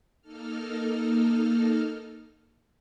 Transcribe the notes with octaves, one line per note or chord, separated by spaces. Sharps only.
A#3 D#4 A4 F6